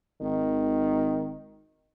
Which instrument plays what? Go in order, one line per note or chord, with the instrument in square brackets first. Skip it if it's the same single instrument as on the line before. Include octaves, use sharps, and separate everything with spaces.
[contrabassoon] G#1 [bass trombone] D#3